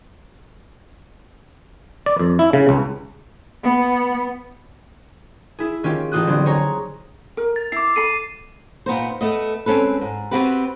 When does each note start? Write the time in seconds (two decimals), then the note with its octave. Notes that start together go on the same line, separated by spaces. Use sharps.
2.06 D5
2.19 F2
2.39 E4
2.53 C#3
2.69 C#2
3.62 B3
5.59 E4 G#4
5.83 D#3 C#4 F4 G4
6.12 A1 F4 D#6 F#6
6.27 D3 F#3 B3 C4
6.46 G#4 C5 C#5 A#5
7.37 A#4
7.56 A6
7.72 E4 D6 C7
7.96 A4 B5 C7 D#7
8.86 A#2 B3 D#4 C5
9.21 A3 B3 D#5
9.66 G#3 C4 C#4 A4 B4
10.01 G#2
10.31 B3 C4 D4 F#4 G4 B4